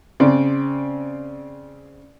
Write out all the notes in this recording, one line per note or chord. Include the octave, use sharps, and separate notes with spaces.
C#3 C4 D5